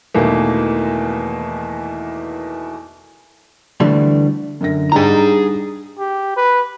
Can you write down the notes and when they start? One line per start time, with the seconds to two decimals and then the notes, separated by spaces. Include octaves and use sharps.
0.14 E2 B2 D#3 E3 A3 A#3
3.80 D2 D3 E3 G3 A3
4.61 F#2 D3 A#6
4.92 G3 D4 D#4 G#4 A#5
5.99 G4
6.37 B4